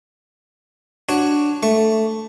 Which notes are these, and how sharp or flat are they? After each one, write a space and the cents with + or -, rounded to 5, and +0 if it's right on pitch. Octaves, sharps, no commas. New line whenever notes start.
D4 +0 F#4 +0 C#5 +0
A3 +0 C#6 +0